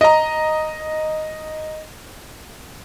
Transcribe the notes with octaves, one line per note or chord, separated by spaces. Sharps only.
D#5 A#5